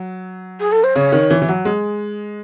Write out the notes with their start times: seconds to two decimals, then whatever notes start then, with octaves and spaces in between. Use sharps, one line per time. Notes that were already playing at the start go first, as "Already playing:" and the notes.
Already playing: F#3
0.60 G#4
0.72 A4
0.84 C5
0.96 C#3 C#5
1.12 D#3
1.30 E3
1.42 E3
1.49 F#3
1.65 G#3